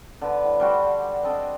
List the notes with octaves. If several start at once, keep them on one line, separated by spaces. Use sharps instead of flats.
D3 B3 B4
A2
G3 D4 F#4 C5
C4 D4 A4 D#5